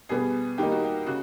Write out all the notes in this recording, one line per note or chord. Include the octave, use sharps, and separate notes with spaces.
B2 G3 B3 G#4
D#3 G3 A#3 D#4 G4
F#4
G4
C#3 F#4